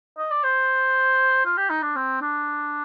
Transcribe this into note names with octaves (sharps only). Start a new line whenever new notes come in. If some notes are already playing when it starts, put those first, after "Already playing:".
D#5
D5
C5
F4
G4
D#4
D4
C4
D4